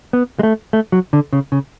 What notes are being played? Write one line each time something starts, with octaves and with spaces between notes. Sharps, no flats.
B3
G#3
A3
A3
F#3
D3
C#3
C#3